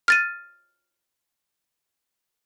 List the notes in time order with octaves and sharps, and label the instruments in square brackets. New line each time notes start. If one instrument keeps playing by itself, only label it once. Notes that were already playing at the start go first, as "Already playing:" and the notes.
[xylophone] F6 A6 D#7